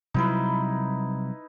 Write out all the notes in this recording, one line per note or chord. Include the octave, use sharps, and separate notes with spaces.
C3 F#3 G3 D#4 E4 B4